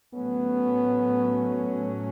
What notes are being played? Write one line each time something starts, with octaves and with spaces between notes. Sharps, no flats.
A2 F#3 A3 B3 C#4